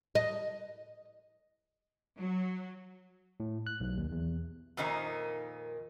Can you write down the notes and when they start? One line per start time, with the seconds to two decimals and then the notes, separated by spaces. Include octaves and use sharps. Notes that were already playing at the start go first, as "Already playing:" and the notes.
0.15 D#5
2.19 F#3
3.40 A2
3.67 F#6
3.80 B1
3.97 D#2
4.12 E2
4.77 F2 A#2 D#3 D#4